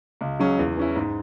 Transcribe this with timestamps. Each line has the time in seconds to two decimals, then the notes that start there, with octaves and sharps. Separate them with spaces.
0.21 C#2
0.39 C#3 F#3 C#4
0.59 E2
0.77 E3 C#4 E4
0.96 G#2